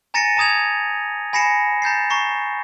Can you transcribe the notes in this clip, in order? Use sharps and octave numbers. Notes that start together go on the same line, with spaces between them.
G#5 A#5 A6 A#6 C#7 D#7
A5 A#5 D#6 G#6 F7
G#5 B5 A#6 C7 C#7 E7
A#5 G6 A6 C7
A#5 C#6 C7